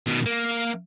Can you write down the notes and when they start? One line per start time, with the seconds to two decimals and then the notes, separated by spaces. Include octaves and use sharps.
0.07 B2 D#3
0.26 A#3